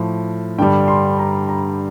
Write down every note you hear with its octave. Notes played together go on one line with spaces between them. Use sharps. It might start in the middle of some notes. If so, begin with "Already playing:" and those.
Already playing: A2 F3
G2 D3 G3 G5
C6
A#5
A#5